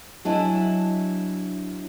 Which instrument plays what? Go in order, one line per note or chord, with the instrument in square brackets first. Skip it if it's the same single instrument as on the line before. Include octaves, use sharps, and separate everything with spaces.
[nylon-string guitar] F#3 D4 E4 D#5 E5 G#5